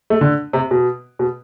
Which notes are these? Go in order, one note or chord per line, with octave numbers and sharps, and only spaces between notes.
A3
D3
C3
B2
B2